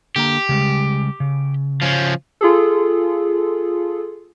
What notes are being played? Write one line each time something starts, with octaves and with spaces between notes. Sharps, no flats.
D3 A#3 G4 A#5
C#3 G3 G#3
C#3
F3 C#4
F4 G#4 A4